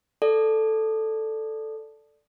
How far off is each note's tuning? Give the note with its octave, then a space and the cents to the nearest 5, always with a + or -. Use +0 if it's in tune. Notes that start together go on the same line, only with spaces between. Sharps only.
A4 +0 D5 +0